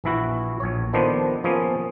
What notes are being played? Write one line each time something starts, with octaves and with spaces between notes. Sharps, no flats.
A#1 E3 E4 F#4
A#1 C#5
D#3 F3 B3 D4 A4 C5
F3 A#3 B3 C#4 G#4